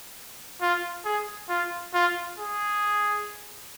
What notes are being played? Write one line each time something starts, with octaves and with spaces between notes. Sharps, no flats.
F4
G#4
F4
F4
G#4